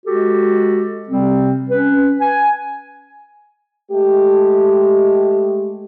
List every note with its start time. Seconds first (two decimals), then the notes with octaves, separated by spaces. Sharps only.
0.07 G#3 F#4 G4 A4
1.09 C3 G3 C4
1.69 C#4 B4
2.20 G#5
3.91 G#3 A3 G4